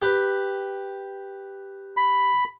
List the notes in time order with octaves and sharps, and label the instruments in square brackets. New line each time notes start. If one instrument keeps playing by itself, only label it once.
[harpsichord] G4 B4
[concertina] B5